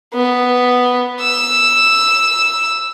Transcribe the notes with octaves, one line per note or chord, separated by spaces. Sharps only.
B3
E6